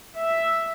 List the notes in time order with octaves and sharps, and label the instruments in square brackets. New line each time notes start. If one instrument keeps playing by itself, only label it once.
[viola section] E5